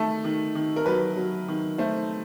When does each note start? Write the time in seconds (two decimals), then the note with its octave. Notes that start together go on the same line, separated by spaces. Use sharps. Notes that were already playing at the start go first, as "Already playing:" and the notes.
Already playing: D#3 A3 A4
0.24 D#3
0.55 D#3
0.76 A#4
0.86 F#3 B4
1.16 F#3
1.48 D#3
1.78 A3 C5